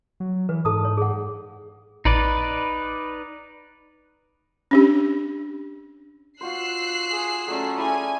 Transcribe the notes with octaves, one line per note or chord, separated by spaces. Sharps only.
F#3
E3 B4
G#2 A4 A5 D#6
C#5
G#4 F#5
A1 D#4 B4 D5
C#4 D4 G4
F4 F#4 C5 E6 F#6 C7
G#4
F#3 A3 C#4 D5
E4 G#4 G#5